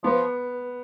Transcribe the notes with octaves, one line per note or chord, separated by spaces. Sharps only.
F3 B3